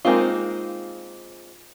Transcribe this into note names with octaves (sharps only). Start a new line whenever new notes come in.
G#3 A#3 C4 D#4 F4